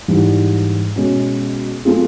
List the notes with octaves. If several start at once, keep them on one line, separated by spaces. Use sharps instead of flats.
G#2 E3 G3
B2 G#3 C#4
F#3 A3 C4 F4 G#4